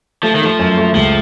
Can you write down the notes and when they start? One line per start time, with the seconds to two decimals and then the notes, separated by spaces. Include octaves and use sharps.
0.23 F3 A3
0.35 D#3
0.41 F3 A3
0.59 F#2
0.77 A3
0.95 C#2 F3